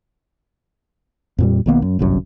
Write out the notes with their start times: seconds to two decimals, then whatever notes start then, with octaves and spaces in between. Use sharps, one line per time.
1.38 F2 A#2 G3
1.66 B1 D#3 A#3 B3
1.82 F#2
1.99 G1 C2 F#2